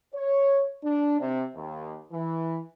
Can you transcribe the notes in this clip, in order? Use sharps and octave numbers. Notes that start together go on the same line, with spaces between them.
C#5
D4
C3
D#2
E3